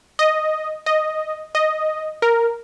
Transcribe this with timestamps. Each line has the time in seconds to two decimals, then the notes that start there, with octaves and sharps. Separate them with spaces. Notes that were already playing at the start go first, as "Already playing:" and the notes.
0.19 D#5
0.86 D#5
1.55 D#5
2.22 A#4